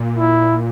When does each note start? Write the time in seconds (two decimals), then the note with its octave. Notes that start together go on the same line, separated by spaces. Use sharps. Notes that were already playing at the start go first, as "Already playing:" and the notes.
Already playing: A#2
0.18 E4